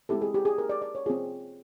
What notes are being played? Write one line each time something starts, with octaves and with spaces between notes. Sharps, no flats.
G#3 C4 E4 G4 A4
G#4
G4
G#4
A#4
D5
D5
C#5
C4 F4 G#4